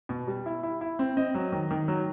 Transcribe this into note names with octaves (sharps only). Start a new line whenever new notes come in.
B2
G3
E4
E4
E4
C4
C4 D#5
F#3
D#3
D#3
F#3